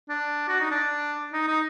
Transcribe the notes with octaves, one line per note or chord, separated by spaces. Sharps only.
D4
F#4
D#4
D4
D#4
D#4